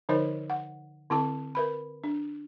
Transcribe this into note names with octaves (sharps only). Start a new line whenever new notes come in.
D3 F3 D#4 A#4 C5 D#5
F#5
D3 C4 E4 A4 A5 D6
A#4 B4 B5
D4